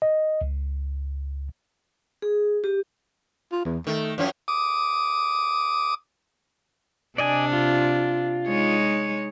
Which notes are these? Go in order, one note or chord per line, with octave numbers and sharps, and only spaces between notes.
D#5
C#2
G#4
G4
F4
E2
D#3 A3
F#2 F3 C#4
D6 D#6
C3 D4 D5 D#5 G#5
F4
G#3 D#4 C#5